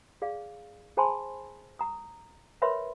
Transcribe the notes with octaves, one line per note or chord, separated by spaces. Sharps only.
G#4 D5 F5
G#4 C5 G#5 A5 B5 C6
A#5 D#6
A#4 B4 C#5 E5 B5 C6